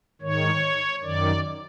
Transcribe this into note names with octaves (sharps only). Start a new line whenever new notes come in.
G#2 D#3 C#5
F#2 D#3 D5